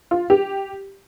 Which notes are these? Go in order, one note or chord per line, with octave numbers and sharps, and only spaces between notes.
F4
G4